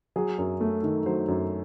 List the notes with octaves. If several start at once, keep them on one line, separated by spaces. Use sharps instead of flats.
F#3 G#4
F#2
A3
D#3
F#3 C5
F#2